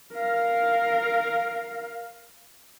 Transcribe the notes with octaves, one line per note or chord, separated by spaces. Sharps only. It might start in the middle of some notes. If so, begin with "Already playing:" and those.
A#4 F5